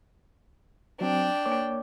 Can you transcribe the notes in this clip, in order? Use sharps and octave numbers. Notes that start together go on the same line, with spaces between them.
F#3 C4 D4 G5
A#3 C#5 D6